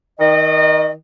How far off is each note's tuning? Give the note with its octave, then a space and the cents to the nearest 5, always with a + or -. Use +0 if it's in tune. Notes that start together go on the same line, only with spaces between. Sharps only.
D#3 +20 D#5 -35